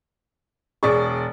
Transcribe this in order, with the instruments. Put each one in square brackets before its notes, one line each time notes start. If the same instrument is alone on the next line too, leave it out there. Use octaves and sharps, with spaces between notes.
[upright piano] E1 D5 C#6 [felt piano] G#4